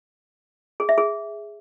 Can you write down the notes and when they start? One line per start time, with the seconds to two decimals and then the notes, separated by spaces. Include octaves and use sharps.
0.80 G#4
0.89 E5
0.98 G#4